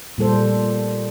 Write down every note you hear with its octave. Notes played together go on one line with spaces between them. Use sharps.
A#2 G3 A4 C5